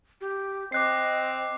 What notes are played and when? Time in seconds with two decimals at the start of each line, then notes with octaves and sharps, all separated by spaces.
0.21 G4
0.72 C4 D#5 D6 F#6 C7